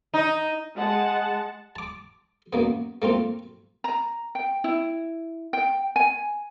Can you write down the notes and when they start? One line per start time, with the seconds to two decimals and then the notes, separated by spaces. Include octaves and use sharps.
0.14 D#4
0.76 G#3 F#5 A5
1.76 A5 D6
2.53 F#2 A#3 B3
3.02 A3 A#3 C4 F4
3.84 A#5
4.35 G5
4.64 E4
5.53 G5
5.96 G#5